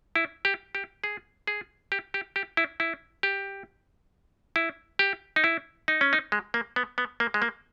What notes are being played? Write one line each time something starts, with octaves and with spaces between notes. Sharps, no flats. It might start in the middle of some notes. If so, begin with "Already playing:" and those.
E4
G4
G4
G#4
G#4
G4
G4
G4
E4
E4
G4
E4
G4
D#4
E4
D#4
C#4
D#4
G#3
A#3
B3
B3
A#3
G#3
A#3